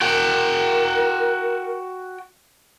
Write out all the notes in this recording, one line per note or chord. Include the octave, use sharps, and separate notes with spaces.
F#4 A#4 G5